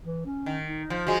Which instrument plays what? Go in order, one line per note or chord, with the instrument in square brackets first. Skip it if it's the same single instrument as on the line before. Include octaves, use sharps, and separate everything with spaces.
[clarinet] E3
C#4
[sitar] D#3
[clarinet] D#4
[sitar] F3
[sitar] F3 G#3 [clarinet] F#4